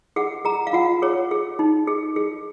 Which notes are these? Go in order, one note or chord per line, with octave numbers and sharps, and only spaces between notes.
G#4 F#5
G#4 A#5
F5
F4 F#5
G#4 C#5
G#4
D#4
G#4
G#4